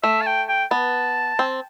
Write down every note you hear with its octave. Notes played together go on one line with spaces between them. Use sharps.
A3 E5
A5
G5
G5
B3 A5
C4